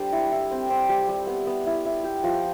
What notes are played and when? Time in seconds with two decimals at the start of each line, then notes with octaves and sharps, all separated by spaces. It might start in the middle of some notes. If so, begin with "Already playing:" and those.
Already playing: G3 D4 A4 C5
0.12 E4
0.32 E4
0.51 C4
0.70 C4
0.89 G3
1.09 G3
1.27 B3
1.47 B3
1.67 E4
1.86 E4
2.04 G4
2.23 F3